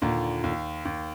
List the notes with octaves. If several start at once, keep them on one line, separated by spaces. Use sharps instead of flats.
D#2 A#2 D3
D#2
D#2